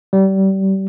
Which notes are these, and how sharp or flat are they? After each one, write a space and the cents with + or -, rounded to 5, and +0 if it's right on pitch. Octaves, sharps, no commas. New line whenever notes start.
G3 -30